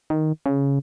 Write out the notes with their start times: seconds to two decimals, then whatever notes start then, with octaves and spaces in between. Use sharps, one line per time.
0.10 D#3
0.46 C#3